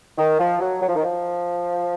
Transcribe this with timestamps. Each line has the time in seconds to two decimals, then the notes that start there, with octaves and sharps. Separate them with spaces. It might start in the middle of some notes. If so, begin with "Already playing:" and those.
0.18 D#3
0.39 F3
0.60 F#3
0.81 F#3
0.89 F3
0.96 D#3
1.02 F3